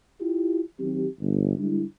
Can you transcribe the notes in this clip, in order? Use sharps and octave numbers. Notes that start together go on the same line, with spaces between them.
E4 F4 G4
D#3 F#3 C4 G4
G1
D3 G3 G#3 D4 E4